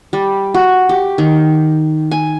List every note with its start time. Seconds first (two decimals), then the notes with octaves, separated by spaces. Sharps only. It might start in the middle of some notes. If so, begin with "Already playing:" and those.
0.13 G3
0.54 F#4
0.89 G4
1.18 D#3
2.11 G#5